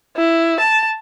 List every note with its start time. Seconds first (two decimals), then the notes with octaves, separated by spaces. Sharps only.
0.17 E4
0.60 A5